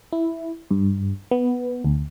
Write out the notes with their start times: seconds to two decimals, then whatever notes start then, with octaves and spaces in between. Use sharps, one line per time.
0.12 E4
0.71 G2
1.31 B3
1.85 D2